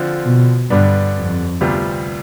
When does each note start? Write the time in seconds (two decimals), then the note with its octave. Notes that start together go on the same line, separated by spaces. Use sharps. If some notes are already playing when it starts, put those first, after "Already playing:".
Already playing: D3 F3 C4 F4
0.24 B2
0.70 G2 D3 G3 B3 D4
1.16 F2
1.61 D2 C3 G3 B3 F4